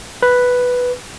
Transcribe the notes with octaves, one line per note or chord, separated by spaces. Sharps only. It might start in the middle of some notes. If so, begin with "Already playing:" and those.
B4